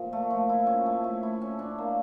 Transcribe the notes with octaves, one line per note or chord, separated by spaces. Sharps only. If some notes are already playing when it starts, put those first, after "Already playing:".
Already playing: A#2 F3
A3
F3
E4
C#4
A3
A3
E4
C#4
D4
A#3